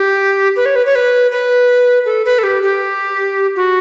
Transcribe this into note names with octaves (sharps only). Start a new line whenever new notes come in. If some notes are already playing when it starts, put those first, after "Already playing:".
Already playing: G4
B4
C#5
B4
C#5
B4
B4
A4
B4
A4
G4
G4
F#4